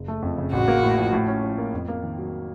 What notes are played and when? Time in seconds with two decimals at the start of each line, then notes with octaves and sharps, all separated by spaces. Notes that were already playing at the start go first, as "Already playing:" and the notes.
Already playing: F#1
0.08 A3
0.22 F2
0.38 C#3
0.52 A1 F#4
0.68 A#3
0.83 A2
0.98 F3
1.13 A2
1.28 C#4
1.43 F3
1.58 A#3
1.74 F2
1.88 A#3
2.03 D#3
2.18 F#3